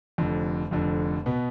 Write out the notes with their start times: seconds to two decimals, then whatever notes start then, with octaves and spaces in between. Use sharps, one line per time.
0.18 F1 F2 D3
0.71 F1 F2 D3
1.26 B2 B3